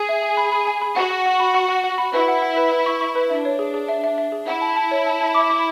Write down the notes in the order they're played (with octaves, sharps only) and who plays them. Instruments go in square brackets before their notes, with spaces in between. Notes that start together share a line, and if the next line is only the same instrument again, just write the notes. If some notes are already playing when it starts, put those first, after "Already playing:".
Already playing: [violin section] G#4
[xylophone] E5
G#5
B5
B5
G#5
B5
[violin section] F#4 [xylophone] F#5
[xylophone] F#5
F#5
B5
F#5
F#5
F#5
B5
[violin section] E4 [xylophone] B4
[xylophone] F#5
F#5
B4
B4
C#6
C#6
B4
[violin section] D4 [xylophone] E5
[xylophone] C#5
G#4
G#4
E5
E5
E5
G#4
[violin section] E4 [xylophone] F#5
[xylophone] A5
A5
C#5
A5
A5
D6
D6